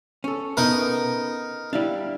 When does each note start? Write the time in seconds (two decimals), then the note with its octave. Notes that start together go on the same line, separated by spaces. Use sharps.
0.24 C#4 A4
0.57 B3 D#4 A#4
1.73 G3 D4 E4 F5